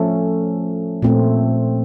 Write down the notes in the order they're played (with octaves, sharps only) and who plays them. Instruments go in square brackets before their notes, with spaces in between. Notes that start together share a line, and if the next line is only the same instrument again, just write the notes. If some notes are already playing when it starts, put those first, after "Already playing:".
Already playing: [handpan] F3 A3 C#4 A4
A#2 A3 C4